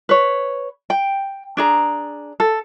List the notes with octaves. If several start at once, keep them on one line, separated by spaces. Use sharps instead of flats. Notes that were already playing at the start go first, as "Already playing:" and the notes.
B4 C#5
G5
D4 G#4 A#5
A4